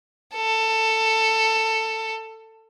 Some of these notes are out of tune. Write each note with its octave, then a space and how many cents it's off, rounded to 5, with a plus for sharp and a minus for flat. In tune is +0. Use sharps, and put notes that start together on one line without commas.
A4 +15